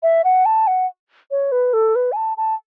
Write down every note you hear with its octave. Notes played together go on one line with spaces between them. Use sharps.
E5
F#5
A5
F#5
C#5
B4
A4
B4
G#5
A5
A5